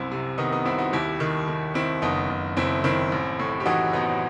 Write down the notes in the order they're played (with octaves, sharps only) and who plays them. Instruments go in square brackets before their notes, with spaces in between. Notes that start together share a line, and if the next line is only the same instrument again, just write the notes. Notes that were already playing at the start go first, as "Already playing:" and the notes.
Already playing: [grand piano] C2 F#2 C4 E4
C3
D#3 B3 D#4
B3 D#4
C2 C4 E4
D#4 F#4
D#2 E4 G4
D#3
D#3
D#3 C4 E4
F#1 B3 D#4
F#1
F#1 C4 E4
D#3 C4 E4
A1
A2
G4
E3 D#4 F#4
A1 B3 D#4